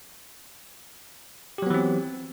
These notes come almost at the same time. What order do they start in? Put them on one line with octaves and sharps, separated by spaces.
G4 F#3 B3 E3 C4